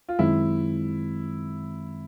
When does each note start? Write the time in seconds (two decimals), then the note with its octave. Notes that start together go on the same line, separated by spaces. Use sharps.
0.09 F4
0.19 F#2 D#3 G#3 C4 E4